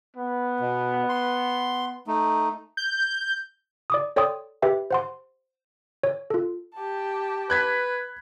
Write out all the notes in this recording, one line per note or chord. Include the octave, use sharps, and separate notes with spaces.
B3
B2
C6
A3 D#4
G6
D5 D6 D#6
A4 C#5 D5 G5 C6 D#6
G4 B4 E5 G5
C5 F#5 C6
C#5
F4 A4
G4 A5
B4 F#6 G#6 B6